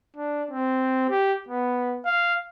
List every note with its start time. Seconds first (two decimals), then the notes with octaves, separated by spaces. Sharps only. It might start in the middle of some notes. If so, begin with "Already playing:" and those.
0.16 D4
0.51 C4
1.10 G4
1.49 B3
2.06 F5